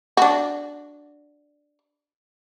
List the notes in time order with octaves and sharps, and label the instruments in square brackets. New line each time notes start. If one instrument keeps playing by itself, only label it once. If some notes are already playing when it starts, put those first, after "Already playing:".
[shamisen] D4 F#4